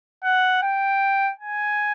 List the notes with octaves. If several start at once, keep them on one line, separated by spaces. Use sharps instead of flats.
F#5
G5
G#5